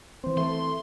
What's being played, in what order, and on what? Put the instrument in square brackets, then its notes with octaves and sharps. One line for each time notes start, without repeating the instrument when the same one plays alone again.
[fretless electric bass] E3 C4 [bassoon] C5
[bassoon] A3 [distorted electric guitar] C6